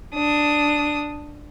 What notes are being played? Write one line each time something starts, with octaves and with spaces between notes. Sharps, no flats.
D4 D#6